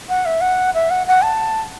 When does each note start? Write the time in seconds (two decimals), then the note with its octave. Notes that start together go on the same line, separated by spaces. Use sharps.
0.09 F#5
0.26 E5
0.41 F#5
0.75 E5
0.90 F#5
1.07 F#5
1.23 A5